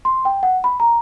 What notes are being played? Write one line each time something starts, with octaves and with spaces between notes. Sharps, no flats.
C6
G5
F#5
B5
A#5